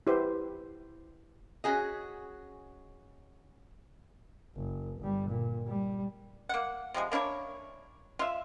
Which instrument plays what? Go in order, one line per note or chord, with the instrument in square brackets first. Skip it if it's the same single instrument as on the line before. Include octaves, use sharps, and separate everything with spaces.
[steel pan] E4 G4 B4 C5
[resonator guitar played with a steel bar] C#4 F#4 G#4 D#5
[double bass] F#1
G1 G3
A#2
G3
[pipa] A#3 F#5
C3 F3 G3 G#3
A#3 D4 E4 C#5
F4 E5